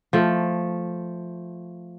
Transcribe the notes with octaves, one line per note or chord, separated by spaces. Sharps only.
F3 A3